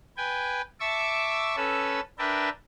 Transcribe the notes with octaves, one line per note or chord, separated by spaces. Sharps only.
B4 G5 G#5
E5 A5 C#6 D6 E6
C#4 A4 B4 E6
D4 A#4 B4 E5 G5 A5